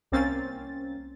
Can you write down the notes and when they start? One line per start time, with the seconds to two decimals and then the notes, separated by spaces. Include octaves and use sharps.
0.12 C2 A#3 C4 C#4 A6